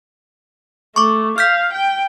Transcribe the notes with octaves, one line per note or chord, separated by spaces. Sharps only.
A3 C#6 D6
F5 F6 G6 B6
G5